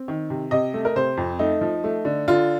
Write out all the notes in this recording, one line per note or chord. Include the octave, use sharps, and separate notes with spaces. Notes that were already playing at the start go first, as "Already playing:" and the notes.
Already playing: C4
D#3
C3
C3 D#5
A3
A#4
C3 C5
F2
A3 D#4
F3
A3
D3
D3 F4